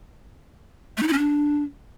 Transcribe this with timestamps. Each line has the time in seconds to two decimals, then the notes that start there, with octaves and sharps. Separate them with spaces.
0.97 A3
1.03 D#4
1.08 E4
1.13 C#4
1.18 D4